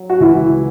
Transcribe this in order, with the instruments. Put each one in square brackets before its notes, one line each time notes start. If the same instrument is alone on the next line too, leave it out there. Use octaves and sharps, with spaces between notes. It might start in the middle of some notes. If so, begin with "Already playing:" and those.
Already playing: [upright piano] F#3
F#4
C#2 E3 E4